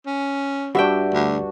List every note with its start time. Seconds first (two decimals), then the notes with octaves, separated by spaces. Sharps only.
0.07 C#4
0.75 G2 D4 F#4 E5 G5
1.14 D2